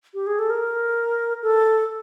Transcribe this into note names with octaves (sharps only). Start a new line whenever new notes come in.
G4
G#4
A4
A#4
A4